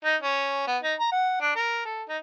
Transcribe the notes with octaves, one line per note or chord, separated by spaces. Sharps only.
D#4
C#4
B3
D#4
A#5
F#5
D4
A#4
A4
D#4